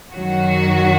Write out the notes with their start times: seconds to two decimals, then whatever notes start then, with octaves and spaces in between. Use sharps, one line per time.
0.13 F#2 D#3 F#3 F#4